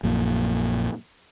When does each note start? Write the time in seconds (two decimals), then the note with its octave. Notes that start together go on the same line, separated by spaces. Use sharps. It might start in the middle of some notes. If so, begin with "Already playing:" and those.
0.04 A#1 F#2 A#2